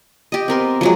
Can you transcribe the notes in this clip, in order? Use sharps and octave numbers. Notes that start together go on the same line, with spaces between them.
G4 D#5
B3 C4 A#4 C6
F3 F#3 G#3